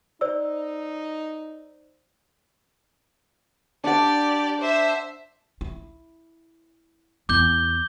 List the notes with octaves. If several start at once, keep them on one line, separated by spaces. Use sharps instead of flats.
D#4 C5 D5 E6
D4 G4 D5 F#5
C5 E5
E4
E2 D6 G6 G7